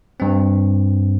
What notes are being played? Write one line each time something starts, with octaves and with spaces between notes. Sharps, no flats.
G2 C4